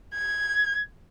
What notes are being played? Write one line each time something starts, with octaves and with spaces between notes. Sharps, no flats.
G#6